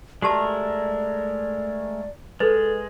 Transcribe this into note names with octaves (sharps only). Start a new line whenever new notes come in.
G#3 A3 F#4 G4 A#4 D5 A5
G#3 A4 B4 A6